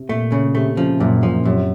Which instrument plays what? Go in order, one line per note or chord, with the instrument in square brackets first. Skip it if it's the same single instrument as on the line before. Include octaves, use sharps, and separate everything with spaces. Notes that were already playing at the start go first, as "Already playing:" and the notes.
Already playing: [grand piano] C3
[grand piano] A#2 [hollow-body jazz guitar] A3
[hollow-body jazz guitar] C#3
[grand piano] C3 [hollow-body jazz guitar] A3
[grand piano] C#3 [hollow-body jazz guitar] F3
[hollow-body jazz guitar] F#2 [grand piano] A#2
[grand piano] A#2 [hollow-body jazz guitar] F3
[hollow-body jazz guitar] F#2 [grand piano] C3